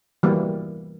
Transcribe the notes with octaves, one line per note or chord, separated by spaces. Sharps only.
E3 G3 A#3 F#4